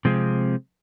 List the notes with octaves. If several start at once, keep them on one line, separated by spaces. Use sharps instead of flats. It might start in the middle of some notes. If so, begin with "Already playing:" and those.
C3 F3 G#3 C4